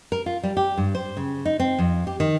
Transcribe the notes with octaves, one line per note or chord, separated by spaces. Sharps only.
A#4
F4
G3
G4
G2
C5
C#3
D#4
C4
F2
G4
D#3